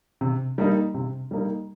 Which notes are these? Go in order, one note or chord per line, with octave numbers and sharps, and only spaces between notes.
C3
G3 A#3 D#4
C3
G3 A#3 D#4